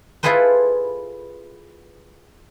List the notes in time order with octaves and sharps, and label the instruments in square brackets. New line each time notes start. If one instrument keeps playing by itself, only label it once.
[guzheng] E4 F4 G#4 A4 B4 C5